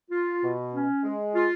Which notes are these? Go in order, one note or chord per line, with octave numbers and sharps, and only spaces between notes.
F4
B2
C#4
G#3
F4